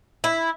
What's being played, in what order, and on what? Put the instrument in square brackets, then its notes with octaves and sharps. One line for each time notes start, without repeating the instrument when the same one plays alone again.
[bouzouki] E4